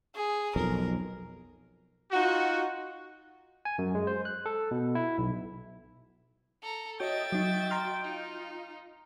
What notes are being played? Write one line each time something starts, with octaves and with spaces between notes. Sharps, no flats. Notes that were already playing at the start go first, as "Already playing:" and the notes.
G#4
B1 F2 A#4
D#4 F4 F#4
G#5
F#2
G#3
C5
F#6
A4
B2
E4
B1
A4 A#5
F#4 C#5 D#5 E5 G5 A6
F#3 D#4 F#4 D#5
A#5 C6 F6
D#4 F4